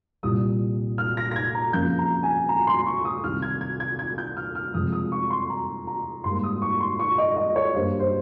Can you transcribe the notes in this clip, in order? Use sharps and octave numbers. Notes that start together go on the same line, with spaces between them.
C2 A#2 G3 D#6
F6
A#6
A#6
G#6
A#5
F2 C#3 F3 A#3 G6
A#5
G#5
A#5
C6
C#6
D#6
C2 C3 D#3 F6
G#6
G#6
G#6
G#6
G6
F6
F6
F2 C3 F3 G#3 D#6
D#6
C#6
C6
A#5
A#5
G#2 G3 A#3 C6
D#6
C#6
C6
C#6
D#5
D#5
C#5
G2 G3 A#3 C5
C5